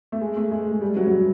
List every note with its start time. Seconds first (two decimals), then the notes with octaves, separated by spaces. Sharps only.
0.12 A3
0.21 G#3
0.36 A3
0.51 G#3
0.72 G#3
0.81 G3
0.96 F#3
1.07 F#3
1.12 G3